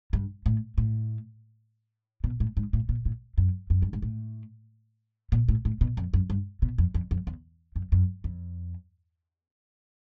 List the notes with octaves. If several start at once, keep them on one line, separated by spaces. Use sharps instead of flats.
G2
A2
A2
B2
A2
G#2
A2
A#2
A2
F#2
F#2
G2
G#2
A2
A#2
A2
A2
B2
F2
F#2
G2
B2
F2
F2
F2
E2
F#2
F#2
F2